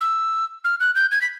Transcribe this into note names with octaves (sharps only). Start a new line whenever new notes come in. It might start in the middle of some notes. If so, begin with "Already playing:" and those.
E6
F6
F#6
G6
G#6
B6